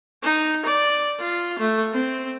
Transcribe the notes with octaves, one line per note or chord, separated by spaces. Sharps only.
D#4
D5
F4
A3
C4